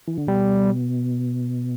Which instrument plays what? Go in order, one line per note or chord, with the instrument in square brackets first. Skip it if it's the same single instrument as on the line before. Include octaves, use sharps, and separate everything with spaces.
[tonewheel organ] E3
D3
[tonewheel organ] B2 [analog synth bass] G3